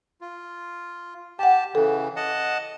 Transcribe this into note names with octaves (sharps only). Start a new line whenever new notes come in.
F4
G4 F#5 G5 A5
C#3 E3 A4
D#5 F#5 A5